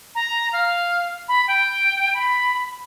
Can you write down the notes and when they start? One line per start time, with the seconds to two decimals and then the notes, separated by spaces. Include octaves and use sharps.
0.15 A#5
0.53 F5
1.28 B5
1.48 G5
2.14 B5